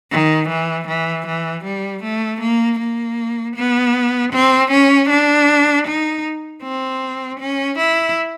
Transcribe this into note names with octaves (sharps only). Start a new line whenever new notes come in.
D#3
E3
E3
E3
G3
A3
A#3
A#3
B3
C4
C#4
D4
D#4
C4
C#4
E4